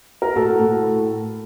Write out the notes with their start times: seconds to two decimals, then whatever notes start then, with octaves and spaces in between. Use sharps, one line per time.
0.22 A#4
0.36 A2 F#4 A4
0.59 A2
0.83 A2